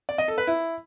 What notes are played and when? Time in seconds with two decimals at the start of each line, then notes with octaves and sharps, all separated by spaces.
0.09 D5
0.18 D#5
0.28 A4
0.38 B4
0.47 E4